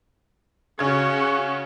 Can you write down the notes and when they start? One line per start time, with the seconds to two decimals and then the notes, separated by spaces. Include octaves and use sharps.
0.79 C#3 C#4 F#4 G#6